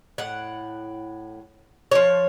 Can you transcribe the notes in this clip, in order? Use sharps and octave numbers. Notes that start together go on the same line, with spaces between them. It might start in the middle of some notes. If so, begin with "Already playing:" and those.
A2 F#5
F3 C#5